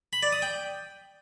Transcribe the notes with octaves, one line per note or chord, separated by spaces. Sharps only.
B5
D5
D#6
G5